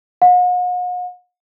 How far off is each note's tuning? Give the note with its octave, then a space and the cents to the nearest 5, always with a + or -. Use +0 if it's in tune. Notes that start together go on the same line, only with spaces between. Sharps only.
F#5 -45